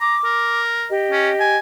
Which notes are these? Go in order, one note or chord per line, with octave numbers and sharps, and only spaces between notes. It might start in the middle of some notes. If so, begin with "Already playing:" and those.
A#5 D6
A#4
G4 D#5
C#4
G#5